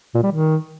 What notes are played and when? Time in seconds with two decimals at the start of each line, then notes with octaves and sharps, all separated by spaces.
0.15 A#2
0.23 G3
0.31 D#3